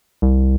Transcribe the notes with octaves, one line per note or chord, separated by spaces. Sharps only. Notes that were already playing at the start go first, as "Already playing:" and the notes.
C2